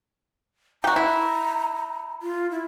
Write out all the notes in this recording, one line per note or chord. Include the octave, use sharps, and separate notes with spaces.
F#4 G4 A#5
E4
F4
E4